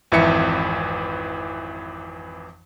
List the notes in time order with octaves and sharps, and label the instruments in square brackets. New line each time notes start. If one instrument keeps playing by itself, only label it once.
[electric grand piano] G#1 F2 E3 E5 C#7